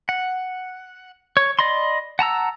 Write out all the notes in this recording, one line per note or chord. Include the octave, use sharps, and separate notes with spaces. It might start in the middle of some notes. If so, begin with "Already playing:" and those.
F#5
C#5
D5 D#5 B5 C6
F#5 A5 A#5 E6